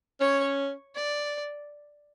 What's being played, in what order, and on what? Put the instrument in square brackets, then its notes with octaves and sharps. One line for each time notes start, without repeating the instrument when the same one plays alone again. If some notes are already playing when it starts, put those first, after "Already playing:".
[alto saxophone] C#4 [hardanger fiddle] C#5
[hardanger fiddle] D5